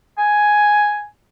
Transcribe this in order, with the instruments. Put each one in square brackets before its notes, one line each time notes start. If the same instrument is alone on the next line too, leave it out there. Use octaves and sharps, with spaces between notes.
[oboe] G#5